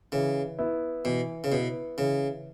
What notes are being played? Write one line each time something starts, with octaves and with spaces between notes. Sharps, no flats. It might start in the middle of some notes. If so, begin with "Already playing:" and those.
C#3 E3
B3 E4
B2 E3
C#3
B2 B3 E4
C#3 E3